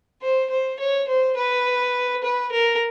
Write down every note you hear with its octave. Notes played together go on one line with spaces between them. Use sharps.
C5
C5
C#5
C5
B4
B4
A#4